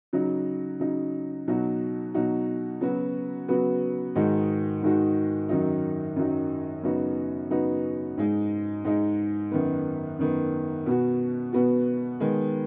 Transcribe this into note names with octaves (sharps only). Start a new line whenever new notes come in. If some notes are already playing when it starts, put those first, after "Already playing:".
C#3 F#3 D#4
C#3 F#3 D#4
B2 F#3 D#4 F#4
B2 F#3 D#4 F#4
C#3 F#3 B3 F#4
C#3 F#3 B3 F#4
G#2 D#3 G#3 D#4 F#4
G#2 D#3 G#3 D#4 F#4
F#2 D#3 F#3 D#4
F#2 D#3 F#3 D#4
F#2 C#3 B3 D#4 F#4
F#2 C#3 B3 D#4 F#4
G#2 G#3 D#4
G#2 G#3 D#4
F#2 D#3 B3
F#2 D#3 B3
B2 B3 F#4
B2 B3 F#4
D#3 G#3 B3